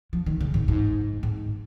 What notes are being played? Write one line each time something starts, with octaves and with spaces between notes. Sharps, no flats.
F3
D#3
C#3
G#2
G#2
G#2